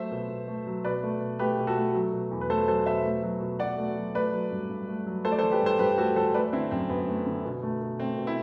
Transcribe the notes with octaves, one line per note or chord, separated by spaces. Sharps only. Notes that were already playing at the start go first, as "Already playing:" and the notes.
Already playing: F#3 A3 C5 E5
B2
B2
A3
F#3
B2 B4 D5
A3
B2
A3 G4 B4
B2
F#4 A4
A3
F#3
B2
E2
B4
A3 A4 C5
F#3 A4 C5
B2 C5 E5
A3
F#3
B2
B2 D5 F#5
A3
F#3
A3 B4 D5
F#3
G2
G2
A3
F#3
A3 A4 C5
D5
A4 C5
E3
G4 B4
G2 A4 C5
G2 G4 B4
A3 F#4 A4
E3 A4 C5
A3 B4 D5
D3 C4 E4
F#2 C4
F#2 B3
A3
D3
B2
A3
B2
A3 C4
B2
C4 E4